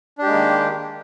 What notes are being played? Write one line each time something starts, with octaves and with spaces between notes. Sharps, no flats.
D#3 G#3 A#3 D4 G4